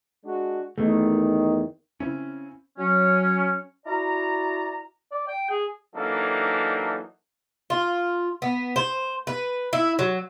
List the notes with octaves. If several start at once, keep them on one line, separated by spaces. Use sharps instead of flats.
G#3 D4 F#4
E2 D#3 A3
C#3 C4 C#4 E4
F#3 C#4
E4 F#4 D5 A#5
D5
G5
G#4
E3 F#3 A#3 D4 D#4 A4
F4
B3
C5
B4
E4
F#3